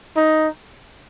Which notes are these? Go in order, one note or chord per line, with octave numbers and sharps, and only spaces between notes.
D#4